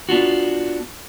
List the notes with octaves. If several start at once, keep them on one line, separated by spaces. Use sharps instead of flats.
B3 D4 F4 F#4